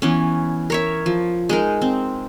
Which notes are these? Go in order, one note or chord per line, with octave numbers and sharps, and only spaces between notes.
E3 B3 C#4
A#4 C#5 E5
F3
G#3 D#4 A#4
C4